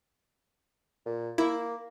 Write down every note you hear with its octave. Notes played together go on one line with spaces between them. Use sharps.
A#2
A#3 E4